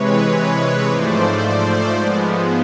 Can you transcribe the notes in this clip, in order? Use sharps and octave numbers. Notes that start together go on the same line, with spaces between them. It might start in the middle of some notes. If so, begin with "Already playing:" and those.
Already playing: C3 E3 G#3 B4 C#5
G#2 F3 A3 C5 D5
G#2 F3 G#3 B3